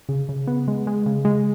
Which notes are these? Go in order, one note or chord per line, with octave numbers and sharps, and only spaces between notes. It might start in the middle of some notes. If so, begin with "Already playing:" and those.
C#3
C#3
B3
G#3
G#3
C#3
G#3